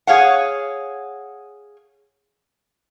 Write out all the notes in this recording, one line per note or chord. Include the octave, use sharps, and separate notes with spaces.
G#4 C#5 F5 F#5